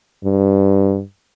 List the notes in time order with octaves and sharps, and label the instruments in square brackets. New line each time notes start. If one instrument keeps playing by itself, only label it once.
[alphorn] G2